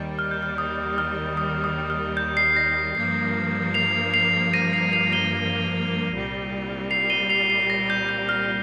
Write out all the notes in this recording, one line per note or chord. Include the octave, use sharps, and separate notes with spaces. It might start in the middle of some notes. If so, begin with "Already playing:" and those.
Already playing: D#2 D#3 G3
F6
G6
F6
D#6
F6
D#6
D#6
F6
G6
C7
A#6
G2 F3 A#3 C7
C7 F7
C7 F7
A#6 D#7
C7 F7
C7 F7
D#7 G7
C2 A#2 G3
C7 F7
D#7 G7
C7 F7
C7
A#6
G6
G6
F6